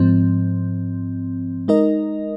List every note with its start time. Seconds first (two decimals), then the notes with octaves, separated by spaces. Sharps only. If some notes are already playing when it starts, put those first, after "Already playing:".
Already playing: G#2 F3 C4
1.68 G#3 D#4 A#4 D#5